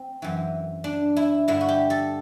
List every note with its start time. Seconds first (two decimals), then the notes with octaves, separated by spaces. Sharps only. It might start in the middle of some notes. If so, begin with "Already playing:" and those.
Already playing: C4
0.22 F#2 E3
0.84 D4
1.17 E4
1.48 G2 D3 E4
1.61 F#4
1.69 G4
1.90 A4